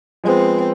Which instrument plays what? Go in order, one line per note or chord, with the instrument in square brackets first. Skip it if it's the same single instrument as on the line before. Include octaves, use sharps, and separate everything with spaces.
[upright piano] F3 G#3 B3 [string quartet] C4